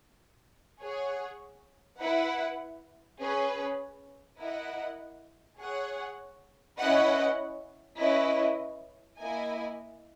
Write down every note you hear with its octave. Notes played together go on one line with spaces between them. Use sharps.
G#4 C#5 F#5
E4 B4 F#5
C#4 G#4 B4
E4 A#4 D#5 F#5
G#4 C#5 F#5
C#4 E4 B4 D#5 F#5
C#4 E4 B4 D#5
A#3 E4 A#4 D#5 G#5